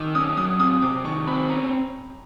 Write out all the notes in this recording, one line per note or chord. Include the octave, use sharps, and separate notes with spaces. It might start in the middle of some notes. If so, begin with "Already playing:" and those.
Already playing: D#3 D6 E6
C#4 D#6
F#3 D#6
C4 D#6
C3 D6
D#3 C#6
C4 B5
C#4 A#5